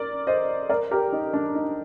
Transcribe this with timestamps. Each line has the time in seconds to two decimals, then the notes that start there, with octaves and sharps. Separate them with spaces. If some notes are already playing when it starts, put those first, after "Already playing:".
Already playing: A#4 D5
0.27 C5 D#5
0.69 A#4 D5
0.91 G4 A#4
1.12 D#4
1.33 D4
1.55 D#4